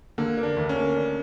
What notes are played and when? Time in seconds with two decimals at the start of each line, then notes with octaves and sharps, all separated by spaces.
0.18 D3 A#3
0.37 A#3
0.43 D4
0.57 D2
0.69 C#4
0.76 A#3
0.96 D4